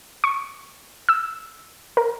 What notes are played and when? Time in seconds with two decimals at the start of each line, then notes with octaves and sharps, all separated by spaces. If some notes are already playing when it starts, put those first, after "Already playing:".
0.24 C#6
1.09 E6
1.97 A#4